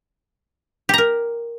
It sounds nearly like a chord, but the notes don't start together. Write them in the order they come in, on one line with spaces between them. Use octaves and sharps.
G4 A#5 A#4